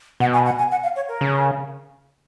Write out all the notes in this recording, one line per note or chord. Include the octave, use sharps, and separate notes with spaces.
B2 F#5
G#5
F#5
G#5
F#5
F5
C#5
A#4
C#3